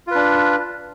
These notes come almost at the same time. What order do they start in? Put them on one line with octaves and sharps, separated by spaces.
F4 B4 D4